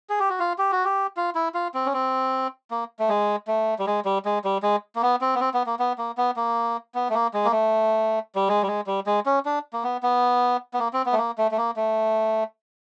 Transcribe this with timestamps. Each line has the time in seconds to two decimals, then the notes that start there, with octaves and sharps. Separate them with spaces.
0.09 G#4
0.20 G4
0.30 F#4
0.40 F4
0.58 G4
0.72 F#4
0.85 G4
1.17 F4
1.35 E4
1.54 F4
1.74 C4
1.86 C#4
1.93 C4
2.71 A#3
2.99 A3
3.09 G#3
3.48 A3
3.79 G3
3.87 G#3
4.05 G3
4.25 G#3
4.44 G3
4.63 G#3
4.96 A#3
5.02 B3
5.21 C4
5.35 B3
5.41 C4
5.54 B3
5.66 A#3
5.79 B3
5.98 A#3
6.17 B3
6.37 A#3
6.95 B3
7.10 A3
7.14 A#3
7.34 G#3
7.45 A#3
7.52 A3
8.35 G3
8.49 G#3
8.63 G3
8.67 G#3
8.87 G3
9.06 G#3
9.26 C#4
9.45 D4
9.73 A#3
9.84 B3
10.03 B3
10.74 B3
10.79 A#3
10.93 C4
11.06 B3
11.13 A3
11.18 A#3
11.38 A3
11.51 A3
11.58 A#3
11.76 A3